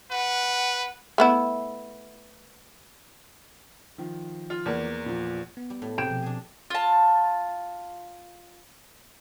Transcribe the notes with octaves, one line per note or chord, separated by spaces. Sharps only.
B4 F#5
A3 B3 E4
D#3 F3
F4
E2 A#3
A#2 F3
B3
G3
A2
C3 G#4 G5 E7
B2 F3
D4 G#4
F4 A5